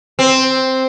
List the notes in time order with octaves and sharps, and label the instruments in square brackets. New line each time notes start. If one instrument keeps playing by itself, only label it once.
[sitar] C4